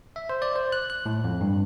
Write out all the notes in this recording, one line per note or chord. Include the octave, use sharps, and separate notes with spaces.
E5
C5
D5
C5
F#6
F#6
A2
F2
G2